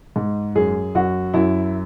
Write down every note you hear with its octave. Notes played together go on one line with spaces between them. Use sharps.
G#2
F#2 G#4
F#2 F#4
F#2 E4